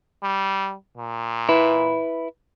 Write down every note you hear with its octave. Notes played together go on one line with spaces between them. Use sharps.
G3
A#2
E4 B4